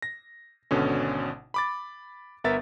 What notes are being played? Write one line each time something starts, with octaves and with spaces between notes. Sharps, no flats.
A#6
G#1 B2 D3 C#4
B5 D6 A6
G1 B3 A#4 E5 A6